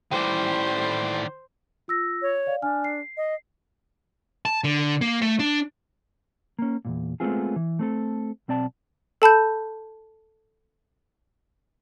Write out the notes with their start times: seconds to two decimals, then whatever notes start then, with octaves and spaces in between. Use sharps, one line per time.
0.11 A2 D#3 E3 C5 D5
1.88 F4 E6 A#6
2.22 C#5
2.47 D5 F5
2.62 D4 G#5 F6
2.84 C7
3.17 D#5
4.45 A5
4.64 D3
5.01 A#3
5.21 A3
5.39 D4
6.59 A#3 C#4
6.85 E2 G2 A#2
7.20 G#3 A3 B3 C4 F4 G#4
7.56 E3
7.79 A3 C4 A4
8.48 B1 C4 D5 A5
9.22 A4 A5 B5 G6